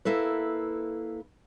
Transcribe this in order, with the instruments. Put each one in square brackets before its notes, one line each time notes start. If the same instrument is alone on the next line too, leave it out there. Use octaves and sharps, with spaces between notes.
[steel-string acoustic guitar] A#3 E4 A4 B4